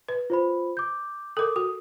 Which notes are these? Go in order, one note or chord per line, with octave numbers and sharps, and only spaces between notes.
B4
F4 C5 B5
D6 G6
A4 A#4 D6 D#6
F#4 D#6